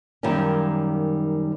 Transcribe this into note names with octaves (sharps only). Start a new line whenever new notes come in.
F#2 D#3 G3 A#3 C#4